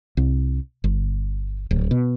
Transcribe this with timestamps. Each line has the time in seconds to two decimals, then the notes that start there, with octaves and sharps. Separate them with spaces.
0.17 C2
0.84 G1
1.71 D1
1.91 B2